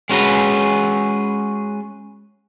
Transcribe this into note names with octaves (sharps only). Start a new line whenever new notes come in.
G#3 C#4 F#4 G#4 B4